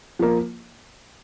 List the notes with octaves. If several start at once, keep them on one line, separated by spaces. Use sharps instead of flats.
F3 A#3